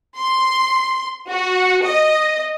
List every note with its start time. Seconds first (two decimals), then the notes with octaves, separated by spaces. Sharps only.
0.18 C6
1.27 F#4
1.85 D#5